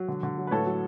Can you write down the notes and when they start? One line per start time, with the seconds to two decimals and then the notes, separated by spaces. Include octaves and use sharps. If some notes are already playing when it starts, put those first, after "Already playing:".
Already playing: F#3
0.08 D3
0.23 D3
0.38 F#3
0.47 B4
0.51 A2 A4 C#5
0.66 F#3